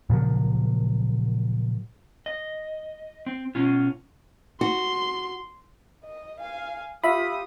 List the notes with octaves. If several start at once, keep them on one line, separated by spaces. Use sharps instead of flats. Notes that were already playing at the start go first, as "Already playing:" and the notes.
A#2 C#3 F3 F#3
D#5
C4
B2 C#4 F4
F#4 C6
D#5
F5 G#5
F4 G4 E5 B5 D#6